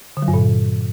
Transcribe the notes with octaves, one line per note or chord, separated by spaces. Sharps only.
D3
F#3
G2
A#2